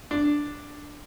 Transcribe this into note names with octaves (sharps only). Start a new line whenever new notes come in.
D4